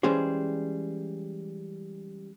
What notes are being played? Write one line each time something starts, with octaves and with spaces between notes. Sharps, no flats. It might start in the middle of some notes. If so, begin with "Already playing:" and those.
E3 G3 G#3 C#4 G#4 C5